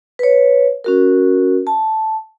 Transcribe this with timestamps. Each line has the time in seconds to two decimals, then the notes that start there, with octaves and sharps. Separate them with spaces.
0.19 B4 C#5
0.84 C#4 F#4 A#4
1.67 A5